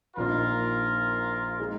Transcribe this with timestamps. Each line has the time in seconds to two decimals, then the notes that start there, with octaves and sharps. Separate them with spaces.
0.16 A#1 A#2 A#3 D#4 F4 A#4
1.59 G#3 D#4 G#4